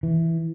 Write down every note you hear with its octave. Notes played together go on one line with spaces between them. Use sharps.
E3